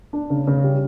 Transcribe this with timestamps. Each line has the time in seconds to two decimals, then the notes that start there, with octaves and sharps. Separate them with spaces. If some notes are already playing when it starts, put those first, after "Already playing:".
0.13 D4
0.30 C#3
0.47 C#3
0.64 G3